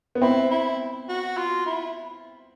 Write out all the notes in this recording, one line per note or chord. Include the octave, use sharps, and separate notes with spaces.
B3
C4 E4
E4
F#4
F4
E4